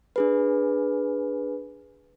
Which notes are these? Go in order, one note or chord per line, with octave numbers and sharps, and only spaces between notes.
D4 G#4 B4